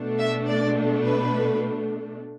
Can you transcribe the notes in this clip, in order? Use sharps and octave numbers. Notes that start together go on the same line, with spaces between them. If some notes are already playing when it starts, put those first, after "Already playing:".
Already playing: B2 A3 D4
E5
D5
B4